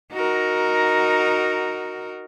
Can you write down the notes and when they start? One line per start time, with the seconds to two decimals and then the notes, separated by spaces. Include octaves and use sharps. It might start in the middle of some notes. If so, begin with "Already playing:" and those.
0.12 D#4 F#4 A#4